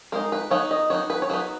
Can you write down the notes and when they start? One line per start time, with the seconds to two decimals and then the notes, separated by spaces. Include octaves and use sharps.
0.12 G#3 D#4 A#4
0.32 B4
0.50 F#3 B3 D#4 C#5
0.71 D#5
0.90 F#3 B3 D#4 C#5
1.10 B4
1.22 C#5
1.30 F#3 B3 D#4 B4